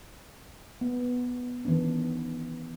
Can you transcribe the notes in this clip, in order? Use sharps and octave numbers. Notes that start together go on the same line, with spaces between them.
B3
D#3 E3 B3 C#4 D4